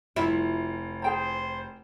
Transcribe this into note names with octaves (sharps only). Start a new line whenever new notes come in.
F1 E4 F4
G#4 C5 G5 A#5